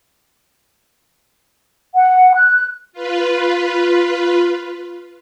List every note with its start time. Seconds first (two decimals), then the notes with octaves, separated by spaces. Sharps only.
1.95 F#5
2.34 F#6
2.93 F4 B4